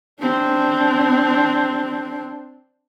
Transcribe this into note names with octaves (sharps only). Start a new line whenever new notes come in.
C4 D4